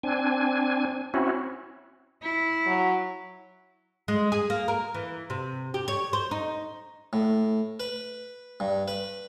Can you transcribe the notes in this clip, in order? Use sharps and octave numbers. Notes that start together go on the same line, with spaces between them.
C4 D4 G#5
C4 C#4 E4 F#4
E4
F#3
G#3
G#4
A#3
A#4
E3
C3
G4
C#5
C5
D#4
A2
B4
G2
B4